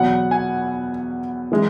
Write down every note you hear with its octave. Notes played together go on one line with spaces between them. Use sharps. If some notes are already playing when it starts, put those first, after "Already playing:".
Already playing: E2 B2 F#3 F#5
G#5
E3 G#3